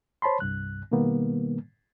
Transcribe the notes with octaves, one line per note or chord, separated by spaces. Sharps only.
C5 C#5 A5 B5 C6
C2 G2 F#6
B2 D#3 G3 A#3 B3